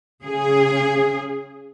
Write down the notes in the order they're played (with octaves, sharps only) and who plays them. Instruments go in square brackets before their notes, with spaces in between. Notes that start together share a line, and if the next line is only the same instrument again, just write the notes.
[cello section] C#3 G#4